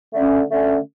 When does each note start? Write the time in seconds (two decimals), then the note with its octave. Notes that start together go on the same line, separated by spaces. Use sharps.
0.14 D3 A3 C#4
0.50 D3 A3 C#4